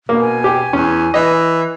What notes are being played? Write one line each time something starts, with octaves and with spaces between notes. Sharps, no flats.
B2 A#3
G#5
G4 G5
E2 C#4
E3 D#5